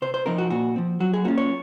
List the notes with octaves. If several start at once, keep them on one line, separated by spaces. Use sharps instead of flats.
C3 C5
C5
F3 C4 D#4 A#4
F#4
A#2 F#4
F3 C4
F#3 F#4
G#4
A#3 C#4 F4 F#4
C#5